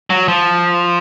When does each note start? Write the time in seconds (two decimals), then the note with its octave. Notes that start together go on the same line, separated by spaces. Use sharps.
0.10 F#3
0.28 F3